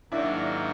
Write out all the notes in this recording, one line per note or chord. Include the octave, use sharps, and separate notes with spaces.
G#2 D#3 F#3 A#3 D4 E4